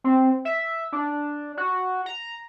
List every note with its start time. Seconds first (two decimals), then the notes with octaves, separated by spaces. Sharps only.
0.04 C4
0.45 E5
0.93 D4
1.57 F#4
2.06 A#5